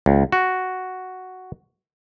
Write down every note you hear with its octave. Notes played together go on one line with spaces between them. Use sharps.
C#2
F#4